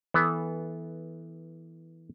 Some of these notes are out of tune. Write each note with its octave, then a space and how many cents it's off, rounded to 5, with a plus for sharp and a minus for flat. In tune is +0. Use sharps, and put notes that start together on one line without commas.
E3 -10 B3 +0 A4 -20